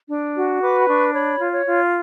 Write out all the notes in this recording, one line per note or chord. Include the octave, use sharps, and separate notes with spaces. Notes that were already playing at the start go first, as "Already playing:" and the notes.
D4
F#4
B4 D6
B5
D4 C#6
C#5 B5
F4
C#5
F4